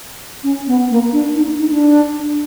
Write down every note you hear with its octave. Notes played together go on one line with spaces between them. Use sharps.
C#4
B3
A#3
D4
D#4
D#4
D4